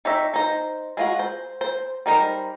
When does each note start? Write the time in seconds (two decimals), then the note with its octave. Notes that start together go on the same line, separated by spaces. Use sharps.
0.05 D#4 G4 C#5 E5
0.34 D#4 C5
0.97 G#3 F4 F#4
1.19 C5
1.61 C5
2.06 G3 D#4 A#4 C5